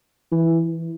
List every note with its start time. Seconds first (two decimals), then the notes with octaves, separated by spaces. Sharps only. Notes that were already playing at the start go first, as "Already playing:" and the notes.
0.32 E3